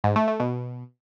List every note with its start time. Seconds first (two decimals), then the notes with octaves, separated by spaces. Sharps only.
0.04 G#2
0.16 A3
0.28 A3
0.40 B2